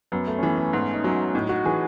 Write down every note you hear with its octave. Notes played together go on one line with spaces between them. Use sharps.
F#2 B3
A3
C#4
E3 B3
A3
G#2 B3
D#4
F#3 C#4
A2 D#4
F#4
E3 G#4